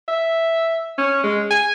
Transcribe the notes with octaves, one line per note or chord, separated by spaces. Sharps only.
E5
C#4
G#3
G#5